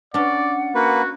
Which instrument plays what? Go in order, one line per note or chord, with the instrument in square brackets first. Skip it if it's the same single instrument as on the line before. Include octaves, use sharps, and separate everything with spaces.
[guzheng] C#4 D4 [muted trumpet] D5 [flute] F#5
[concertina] A#3 B4 [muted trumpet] F#4